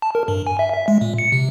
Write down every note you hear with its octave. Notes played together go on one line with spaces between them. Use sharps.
A5
A#4
G2
G#5
E5
E5
G#3
A#2
C#7
C3